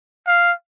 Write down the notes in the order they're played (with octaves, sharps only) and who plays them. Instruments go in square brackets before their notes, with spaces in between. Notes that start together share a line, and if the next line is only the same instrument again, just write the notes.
[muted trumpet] F5